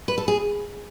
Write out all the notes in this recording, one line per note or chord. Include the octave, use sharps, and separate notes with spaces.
B4
A4
G#4